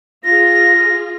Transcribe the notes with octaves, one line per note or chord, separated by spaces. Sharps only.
F4 G#4 A#6